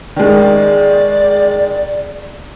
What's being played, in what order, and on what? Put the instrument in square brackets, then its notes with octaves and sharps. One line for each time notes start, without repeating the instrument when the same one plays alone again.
[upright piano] D#3 G#3 [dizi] D5